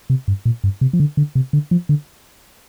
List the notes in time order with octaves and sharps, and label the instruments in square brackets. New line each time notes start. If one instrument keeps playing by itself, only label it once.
[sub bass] C3
G2
A#2
G2
C3
F3
D3
D3
C3
D3
F3
D3